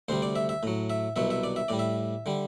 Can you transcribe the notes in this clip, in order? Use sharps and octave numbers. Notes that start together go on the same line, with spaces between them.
D2 C3 G3 C5
D5
E5
E5
A2 F#3
E5
C2 B2 F#3 E5
E5
D5
E5
A2 G3 D5
E5
D3 G3